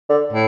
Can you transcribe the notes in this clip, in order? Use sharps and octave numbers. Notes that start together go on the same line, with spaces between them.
D3
A2